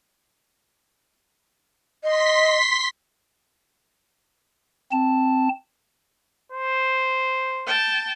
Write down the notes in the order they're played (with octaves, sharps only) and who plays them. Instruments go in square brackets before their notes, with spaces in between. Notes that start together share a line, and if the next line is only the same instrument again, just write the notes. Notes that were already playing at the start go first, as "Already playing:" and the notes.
[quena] D#5 [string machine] C6 B6
[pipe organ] C4 A5
[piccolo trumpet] C5
[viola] G5 A5